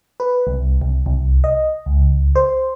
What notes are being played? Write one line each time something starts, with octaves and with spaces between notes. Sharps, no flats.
B4
C2
C2
C2
D#5
C#2
C5